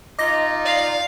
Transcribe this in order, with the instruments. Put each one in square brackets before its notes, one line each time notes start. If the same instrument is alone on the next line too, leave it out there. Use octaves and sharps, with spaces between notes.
[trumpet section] D#4 F4 [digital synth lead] D#5 [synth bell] D6 A#6
[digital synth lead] D5 [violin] F5